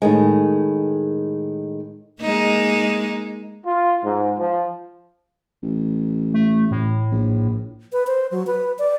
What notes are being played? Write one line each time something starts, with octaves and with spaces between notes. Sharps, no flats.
A2 D#3 G#3
G#3 A#3 D#4
F4
G#2
F3
A1
A3
A2
A#1
B4
C5
F#3
B4
D5